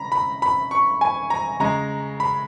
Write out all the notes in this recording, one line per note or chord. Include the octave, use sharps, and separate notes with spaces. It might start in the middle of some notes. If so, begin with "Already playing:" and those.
Already playing: C#3 A#5 B5
B5
B5
C#6
G#5
A#5
C#3 G#3 A#5
B5